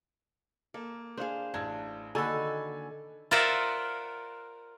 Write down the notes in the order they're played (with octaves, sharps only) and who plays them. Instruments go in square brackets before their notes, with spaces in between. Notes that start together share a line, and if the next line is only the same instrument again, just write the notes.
[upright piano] A#3 [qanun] A4
[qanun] D4 G#4 [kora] C5 F5
[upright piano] A1 A5 G#6 [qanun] D4
[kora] D3 F#4 A4 [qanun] D#3 A#3 [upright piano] G#5 B5
[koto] F4 A#4 C5 D5 E5 F#5